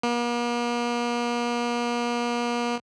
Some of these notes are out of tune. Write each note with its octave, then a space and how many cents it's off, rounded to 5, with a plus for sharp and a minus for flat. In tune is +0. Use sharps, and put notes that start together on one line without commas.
A#3 +45